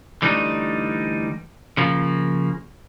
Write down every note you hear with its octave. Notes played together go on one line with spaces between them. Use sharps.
D3 E3 G3 A3 D4 D#4
C#3 F3 A#3